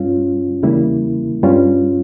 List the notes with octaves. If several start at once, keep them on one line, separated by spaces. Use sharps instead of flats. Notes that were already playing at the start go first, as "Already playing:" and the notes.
Already playing: G2 G3 C#4 F4
E2 C#3 G3 A#3 E4
G2 G3 C#4 F4